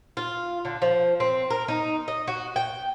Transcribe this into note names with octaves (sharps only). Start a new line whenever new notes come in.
F4
D3
F3
C4
A#4
D#4
D#5
F#4
G5